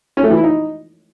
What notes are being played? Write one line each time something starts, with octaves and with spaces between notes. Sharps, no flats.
C#4
A3
E3
E4
D#4